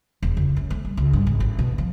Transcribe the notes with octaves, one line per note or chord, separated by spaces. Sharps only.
E1
C#2
F#2
A3
G3
C#2
G2
G#1
A1
B2
F3